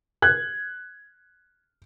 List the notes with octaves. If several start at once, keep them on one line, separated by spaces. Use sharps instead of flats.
F#6 G#6